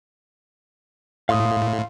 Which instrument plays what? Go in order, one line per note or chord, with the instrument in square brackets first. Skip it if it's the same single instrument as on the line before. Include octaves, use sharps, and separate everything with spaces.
[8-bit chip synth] A2 [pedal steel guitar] F5 C6 D#6